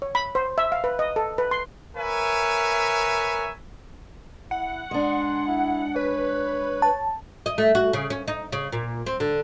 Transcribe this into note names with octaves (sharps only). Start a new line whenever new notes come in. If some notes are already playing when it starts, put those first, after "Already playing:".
C#5
B5
C5
E5
F5
B4
D#5
A4
B4
C6
A#4 B4 C#5 E5 G#5
E4 F#5
G#3 D4 C6
E4
B4 C#5
A5
D#5
A3
F#4
C#3
C#4
D#4
C#3
A#2
C4
D3